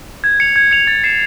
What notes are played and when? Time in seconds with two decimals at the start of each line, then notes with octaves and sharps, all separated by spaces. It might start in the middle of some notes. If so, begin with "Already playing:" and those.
0.24 G#6
0.40 C#7 F7
0.56 G#6
0.71 C#7 F7
0.87 A6
1.04 C7 E7